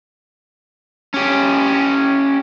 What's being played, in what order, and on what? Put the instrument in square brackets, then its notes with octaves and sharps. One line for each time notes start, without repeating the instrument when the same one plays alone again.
[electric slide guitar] C#4 G4